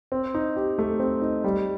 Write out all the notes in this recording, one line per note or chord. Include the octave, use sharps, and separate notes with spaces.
C4
D#4
G4
A3
C4
D#4
G3